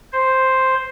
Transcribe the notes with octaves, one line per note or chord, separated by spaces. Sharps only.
C5